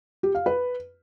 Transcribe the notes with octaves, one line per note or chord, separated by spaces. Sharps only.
G4
F5
B4